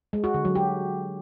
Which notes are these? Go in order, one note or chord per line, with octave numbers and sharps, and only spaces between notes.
G#3
F#4
D3
F#3
G4